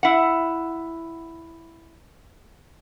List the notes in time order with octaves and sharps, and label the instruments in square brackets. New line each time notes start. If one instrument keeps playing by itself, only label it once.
[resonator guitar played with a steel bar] E4 F#5